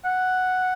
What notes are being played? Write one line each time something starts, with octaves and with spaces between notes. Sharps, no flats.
F#5